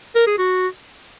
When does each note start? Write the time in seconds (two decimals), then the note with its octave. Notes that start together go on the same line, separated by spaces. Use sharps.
0.15 A#4
0.27 G#4
0.38 F#4